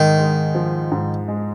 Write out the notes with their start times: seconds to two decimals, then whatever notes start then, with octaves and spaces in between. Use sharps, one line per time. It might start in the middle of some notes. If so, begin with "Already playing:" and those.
Already playing: G#2 D#3 G#3
0.18 G#3
0.55 F3
0.92 G#2
1.28 G#3